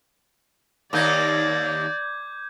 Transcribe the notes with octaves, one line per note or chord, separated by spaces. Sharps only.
D#2 A#3 D#4 D5 D6 G6 G#6